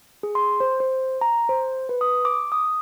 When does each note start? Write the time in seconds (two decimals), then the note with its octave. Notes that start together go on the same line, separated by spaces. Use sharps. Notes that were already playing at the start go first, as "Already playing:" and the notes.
0.23 G#4
0.35 C6
0.60 C5
0.80 C5
1.21 A#5
1.49 C5
1.89 B4
2.01 D#6
2.25 D6
2.52 D#6